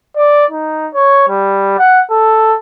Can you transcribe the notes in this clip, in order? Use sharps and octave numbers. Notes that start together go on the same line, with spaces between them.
D5
D#4
C#5
G3
F#5
A4